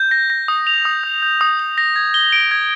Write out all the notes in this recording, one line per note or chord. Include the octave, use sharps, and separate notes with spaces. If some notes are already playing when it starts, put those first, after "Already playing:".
Already playing: G6
A#6
A#6
D#6
F7
D#6
G6
G6
D#6
D#6
A#6
G#6
G7
D7
G#6